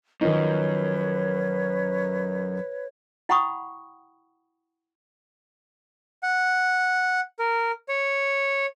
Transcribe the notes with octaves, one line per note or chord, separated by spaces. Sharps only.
F#2 D#3 F3 D#4 B4 C#5
E4 F#5 G5 B5 C#6 D#6
F#5
A#4
C#5